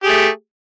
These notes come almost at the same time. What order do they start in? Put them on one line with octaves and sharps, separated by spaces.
G4 G#4 A3